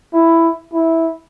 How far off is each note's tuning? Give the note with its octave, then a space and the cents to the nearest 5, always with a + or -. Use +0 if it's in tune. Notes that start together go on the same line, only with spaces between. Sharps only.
E4 +5
E4 -10